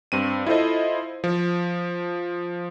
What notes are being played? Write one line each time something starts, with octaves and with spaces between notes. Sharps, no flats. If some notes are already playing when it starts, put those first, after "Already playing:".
G2 C4 D#7
E4 F4 A4 C5 D#5
F3